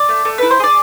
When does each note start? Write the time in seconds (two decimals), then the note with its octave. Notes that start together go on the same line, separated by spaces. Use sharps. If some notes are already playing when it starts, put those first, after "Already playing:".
Already playing: D5
0.09 A3
0.25 A3
0.38 E4 B4
0.51 C5
0.60 G#4 D5